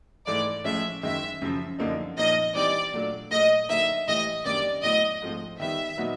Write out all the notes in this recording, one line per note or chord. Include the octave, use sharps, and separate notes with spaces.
G#2 E3 A3 D5
A2 F3 G#3 C#4 E5
F#2 D#3 G#3 E5
F#2 C#3 F3
F#2 D3 F3 A#3 D#4
A#2 F3 A#3 D#4 D#5
E3 G3 C4 D#4 D5
A#2 F#3 A3 D4 F4
A#2 F#3 A3 D#5
D3 F#3 A#3 D#4 E5
A2 E3 G3 D#5
F#2 D#3 G3 A#3 D4 D5
A2 F#3 B3 E4 D#5
G#2 F3 A3 C4 F4
D#3 G3 B3 D#4 E5
A#2 F#3 B3 D#4 F#4